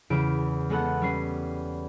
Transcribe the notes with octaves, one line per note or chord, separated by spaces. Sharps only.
E2 C#3 D7
G#3 B3 A4 F#5
G3 C#4 C7